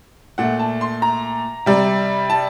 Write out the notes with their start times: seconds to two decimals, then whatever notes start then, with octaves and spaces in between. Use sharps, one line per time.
0.38 A#2 A3 F#5
0.59 A5
0.81 C6
1.02 A#5
1.66 C3 G3
2.30 A5